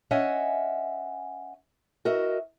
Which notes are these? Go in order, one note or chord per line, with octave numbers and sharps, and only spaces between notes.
C#4 D#5 E5 F#5 G#5
F#4 A#4 D#5 E5